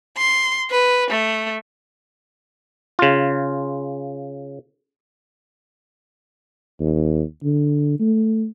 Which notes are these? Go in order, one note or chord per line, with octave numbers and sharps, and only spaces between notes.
C6
B4
A3
C#3 F4
D#2
D3
A3